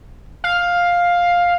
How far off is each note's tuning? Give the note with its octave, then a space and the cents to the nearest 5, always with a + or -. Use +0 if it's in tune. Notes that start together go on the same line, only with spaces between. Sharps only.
F5 +10